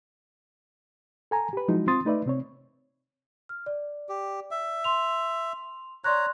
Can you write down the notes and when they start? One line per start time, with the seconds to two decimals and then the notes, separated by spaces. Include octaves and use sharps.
1.31 A4 G#5 A#5
1.53 G4 B4
1.68 F3 F#3 G#3 D#4 E4 F#4
1.87 C4 F4 C6 D#6 A6
2.05 A3 D#4 B4 D5 E5
2.26 C3 C4 C#5
3.49 F6
3.66 D5
4.09 G4
4.51 E5
4.84 C6 F7
6.04 C#5 D5 A#5 C6 F#6